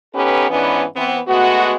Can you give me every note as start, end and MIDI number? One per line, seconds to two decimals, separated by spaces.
0.14 0.49 59
0.14 0.49 61
0.14 0.49 63
0.14 0.49 67
0.14 0.49 69
0.14 0.49 71
0.50 0.83 44
0.50 0.83 52
0.50 0.83 59
0.50 0.83 61
0.50 0.83 62
0.50 0.83 71
0.96 1.20 52
0.96 1.20 59
0.96 1.20 60
1.28 1.75 56
1.28 1.75 57
1.28 1.75 59
1.28 1.75 66